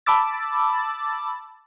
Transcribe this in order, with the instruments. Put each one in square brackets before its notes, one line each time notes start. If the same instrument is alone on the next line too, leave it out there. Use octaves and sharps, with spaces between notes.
[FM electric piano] A5 B5 D6 E6 A6